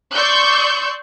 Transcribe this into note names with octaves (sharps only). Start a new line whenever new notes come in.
D5 C6 C#6 E6 G6